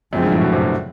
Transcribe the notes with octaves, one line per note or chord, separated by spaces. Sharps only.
F#2 C#3 F3 G#3 C4
G2
A2
B2
C3
B2